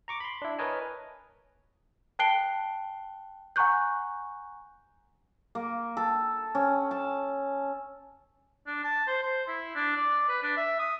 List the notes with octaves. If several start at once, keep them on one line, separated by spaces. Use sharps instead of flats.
A#5 C#6 D6
B5 C6
D4 E4
A#4 B4 C#5 D#5 G#5 A5
G5 A5 F#6 C7 D7 G7
F#5 G#5 A#5 C#6 F#6 G6
A#3
A4
C#4
A5
D4
A5
C5
C5
E4
D4
D5
B4
D4
E5
D#6